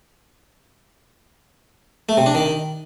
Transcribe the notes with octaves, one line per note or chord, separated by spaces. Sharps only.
A3
C3
D4
D#3